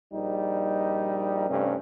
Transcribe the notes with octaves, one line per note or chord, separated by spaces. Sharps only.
A#1 G3 D#4
G2 C3 A3 C#4